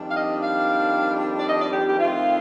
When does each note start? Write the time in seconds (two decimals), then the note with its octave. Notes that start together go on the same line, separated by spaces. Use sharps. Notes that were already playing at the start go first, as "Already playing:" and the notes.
Already playing: F2 D#3 G3 D4
0.10 F5
0.16 D#5
0.42 F5
1.39 D5
1.48 D#5
1.61 D5
1.73 G4
1.87 G4
1.99 F2 D#3 A3 F4